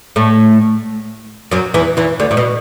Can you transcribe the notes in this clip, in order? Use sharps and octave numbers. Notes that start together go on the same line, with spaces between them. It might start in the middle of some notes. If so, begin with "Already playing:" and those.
A2 A3
F#2 F#3
E2 E3
E2 E3
D2 D3
A2
B2